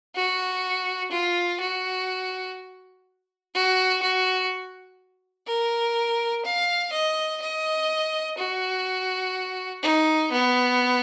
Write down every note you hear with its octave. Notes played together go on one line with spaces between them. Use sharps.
F#4
F4
F#4
F#4
F#4
A#4
F5
D#5
D#5
F#4
D#4
B3